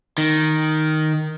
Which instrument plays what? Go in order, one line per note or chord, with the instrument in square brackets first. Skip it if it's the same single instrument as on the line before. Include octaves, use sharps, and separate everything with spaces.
[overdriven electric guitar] D#3